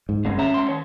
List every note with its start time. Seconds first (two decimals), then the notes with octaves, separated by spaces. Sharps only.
0.09 G#2
0.25 G1 A#2 C#3 G#3
0.38 C2 C#4 E5 A#5
0.54 D2 G#2 C6
0.69 D#3 C#5